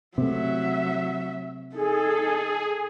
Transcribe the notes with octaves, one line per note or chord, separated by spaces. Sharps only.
C3 F#3 A3 E5
D#4 G#4 A4